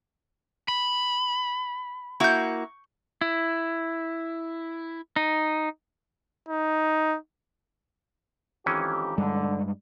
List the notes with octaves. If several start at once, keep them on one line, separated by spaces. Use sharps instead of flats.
B5
A#3 E4 F#4 C#6 G6
E4
D#4
D#4
F2 G#2 D#3 E3 C#4 G4
G2 D3 G3 G#3